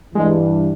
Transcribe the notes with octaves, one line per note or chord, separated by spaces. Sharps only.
G2 E3 G#3